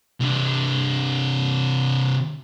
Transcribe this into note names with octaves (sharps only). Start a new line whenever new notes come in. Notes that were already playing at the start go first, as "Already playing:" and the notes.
C3 D4